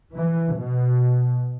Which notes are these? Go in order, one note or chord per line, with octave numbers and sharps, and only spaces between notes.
E3
B2